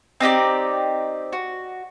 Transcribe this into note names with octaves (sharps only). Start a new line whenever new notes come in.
C4 D#4 G4 D5
F#4